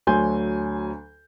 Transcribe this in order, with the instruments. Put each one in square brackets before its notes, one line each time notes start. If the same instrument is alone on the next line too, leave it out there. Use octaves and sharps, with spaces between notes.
[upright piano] D2 F#3 G#5 C6 G6